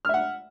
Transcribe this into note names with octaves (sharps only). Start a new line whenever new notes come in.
E5 F#5 F6